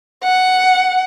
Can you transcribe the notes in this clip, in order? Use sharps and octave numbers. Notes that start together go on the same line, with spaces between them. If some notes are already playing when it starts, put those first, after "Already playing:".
F#5